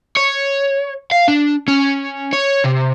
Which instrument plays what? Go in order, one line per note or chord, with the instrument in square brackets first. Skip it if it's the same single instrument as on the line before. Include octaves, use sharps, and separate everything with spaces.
[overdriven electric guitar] C#5
F5
D4
C#4
C#5
C3